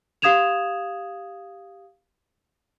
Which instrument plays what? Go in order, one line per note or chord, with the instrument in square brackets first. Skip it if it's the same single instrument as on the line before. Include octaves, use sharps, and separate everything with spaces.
[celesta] G4 F5 D#6 G#6 E7 F7